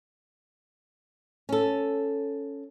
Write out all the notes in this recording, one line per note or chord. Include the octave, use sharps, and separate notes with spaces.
C#4 A4